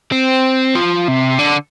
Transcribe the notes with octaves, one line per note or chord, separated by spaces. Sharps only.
C4
F3
C3
D3